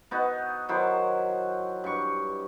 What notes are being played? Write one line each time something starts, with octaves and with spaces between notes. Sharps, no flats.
B3 D#4 F#4
D#3 F#3 E4 C5
G2 C#6